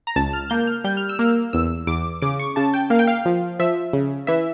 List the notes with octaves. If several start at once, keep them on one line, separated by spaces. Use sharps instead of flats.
A#5
C#2 A5
F6
A#3 G6
F6
G3 G6
F6
E6
A#3 F6
E2 E6
E2 D6
C#3 D6
C#6
C#3 A5
G5
A#3 F5
G5
F5
F3
F3 E5
C#3
E3 E5